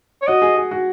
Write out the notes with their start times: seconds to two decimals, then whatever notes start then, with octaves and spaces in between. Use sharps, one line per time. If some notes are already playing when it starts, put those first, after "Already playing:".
0.22 C#5
0.27 F#4 D#5
0.42 G#4
0.57 G#4
0.71 F#4